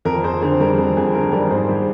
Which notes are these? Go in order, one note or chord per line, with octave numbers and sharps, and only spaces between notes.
F2 A#4
F2 G#4 C5
D3 G#4 C5
G3 A#4
F2 G#4
F2 G#4
D3 A#4
G3 A#4 D5
G#2 G#4 C5
G3